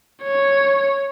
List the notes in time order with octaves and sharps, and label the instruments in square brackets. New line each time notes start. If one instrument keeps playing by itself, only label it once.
[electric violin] C#5